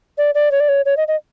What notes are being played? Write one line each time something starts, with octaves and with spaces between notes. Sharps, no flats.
D5
D5
C#5
D5
C#5
C#5
D#5
D#5